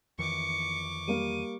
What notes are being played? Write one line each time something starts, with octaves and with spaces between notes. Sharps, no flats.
F2 D#3 E3 C#6 D6 C#7
G3 A#3 D#7